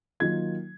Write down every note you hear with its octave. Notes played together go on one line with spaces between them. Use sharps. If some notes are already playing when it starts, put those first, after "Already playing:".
D#3 F#3 A#3 F4 G#6